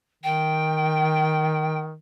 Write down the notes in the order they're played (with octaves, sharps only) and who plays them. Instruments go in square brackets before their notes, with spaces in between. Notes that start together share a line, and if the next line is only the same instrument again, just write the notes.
[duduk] D#3 [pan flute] G5